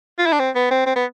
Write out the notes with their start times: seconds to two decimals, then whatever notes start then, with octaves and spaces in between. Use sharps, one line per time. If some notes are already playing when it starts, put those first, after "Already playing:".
0.19 F4
0.26 E4
0.32 D4
0.40 C4
0.55 B3
0.71 C4
0.86 C4
0.96 B3